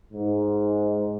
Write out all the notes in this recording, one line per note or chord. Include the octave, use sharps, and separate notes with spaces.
G#2